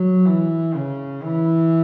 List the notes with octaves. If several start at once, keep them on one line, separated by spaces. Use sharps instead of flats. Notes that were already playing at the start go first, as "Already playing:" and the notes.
Already playing: F#3
E3
C#3
E3